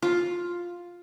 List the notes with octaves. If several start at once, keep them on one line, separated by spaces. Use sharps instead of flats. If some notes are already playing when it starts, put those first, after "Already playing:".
F4